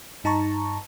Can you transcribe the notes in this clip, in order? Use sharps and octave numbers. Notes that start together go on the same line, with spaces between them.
G2 D#4 A5 A#5 C#6